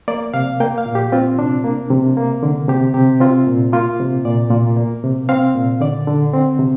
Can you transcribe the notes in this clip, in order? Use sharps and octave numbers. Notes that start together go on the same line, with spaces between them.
A#3 D5
C3 F5
A#3 G5
F5
A#2
G4
C4 F4
C3 D4
A#3
C3
A#3
D3
C3 G4
C3 G4
C4 F4
A#2
A#3 F4
C3
A#2 D5
A#2
A#3
C3
C4 F5
A#2
D3 D5
D3
C4
C3